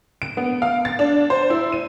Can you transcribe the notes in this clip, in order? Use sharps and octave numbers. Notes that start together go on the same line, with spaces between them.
D7
B3
F5
A6
D4
C5
E4
D#7